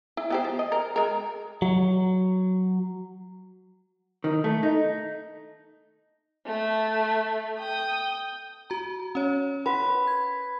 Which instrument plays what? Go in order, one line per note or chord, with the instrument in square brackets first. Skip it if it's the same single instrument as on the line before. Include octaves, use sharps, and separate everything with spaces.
[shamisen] E4
B3 G4 C5
F3
D#5
A#4
G#3 A#4
[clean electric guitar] F#3
[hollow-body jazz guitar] D#3
A3
D#4
[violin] A3
G5 D#6
[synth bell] F#4 A#5
C#4 C#5
[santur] B4 [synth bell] F#5 C6
[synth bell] G#6